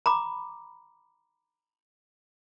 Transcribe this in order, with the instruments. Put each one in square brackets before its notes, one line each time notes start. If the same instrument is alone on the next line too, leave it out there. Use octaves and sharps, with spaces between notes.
[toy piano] A#5 B5 D6